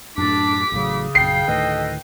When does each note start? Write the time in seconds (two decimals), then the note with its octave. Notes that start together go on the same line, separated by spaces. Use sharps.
0.18 F#2 A2 D4 D6 B6
0.72 A1 A2 C#3 F#3
1.15 A#1 F#2 G5 C7
1.48 D2 A2 D#3 A4 B4 D#5